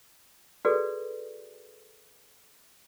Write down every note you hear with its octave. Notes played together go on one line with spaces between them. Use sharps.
F#4 G#4 A4 B4 D5